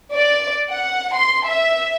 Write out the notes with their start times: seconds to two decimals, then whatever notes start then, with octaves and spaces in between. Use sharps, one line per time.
0.14 D5
0.70 F#5
1.14 C6
1.46 E5